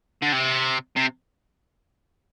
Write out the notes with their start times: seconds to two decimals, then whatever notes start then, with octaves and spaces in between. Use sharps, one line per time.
0.22 D3
0.33 C3
0.96 C3